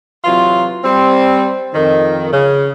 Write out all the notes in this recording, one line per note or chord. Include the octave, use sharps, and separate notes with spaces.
C3 E3 F#3 F4
G3 C4
F2 D#3
C#3